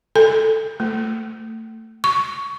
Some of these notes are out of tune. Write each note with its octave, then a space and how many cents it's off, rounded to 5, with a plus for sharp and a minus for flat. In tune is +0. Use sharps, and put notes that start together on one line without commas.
A4 +5
A3 +25
C#6 +20